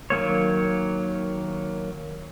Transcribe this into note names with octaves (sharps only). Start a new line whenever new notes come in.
D#3 F#3 A#3 C#5